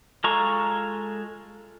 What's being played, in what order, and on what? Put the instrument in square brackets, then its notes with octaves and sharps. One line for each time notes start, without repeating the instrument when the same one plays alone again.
[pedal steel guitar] G#3 F4 A4 A#5 C#6